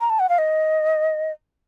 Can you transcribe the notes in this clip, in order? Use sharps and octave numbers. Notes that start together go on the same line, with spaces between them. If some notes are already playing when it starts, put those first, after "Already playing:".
A#5
A5
F#5
F5
D#5